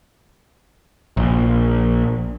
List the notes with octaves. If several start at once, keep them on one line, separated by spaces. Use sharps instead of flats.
A#1